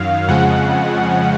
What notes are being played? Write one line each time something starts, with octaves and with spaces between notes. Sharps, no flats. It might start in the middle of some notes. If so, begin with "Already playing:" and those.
Already playing: F#2 D#3 F#3 F5
F2 C#3 F3 G#3 F#5